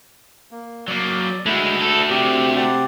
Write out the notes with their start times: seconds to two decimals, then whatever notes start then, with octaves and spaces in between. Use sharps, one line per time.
0.51 A#3
0.88 F#3 A#3 D5
1.46 G#3 A3 E4 F#4
1.81 A4
2.10 C3 G4
2.56 G4 D5 F#5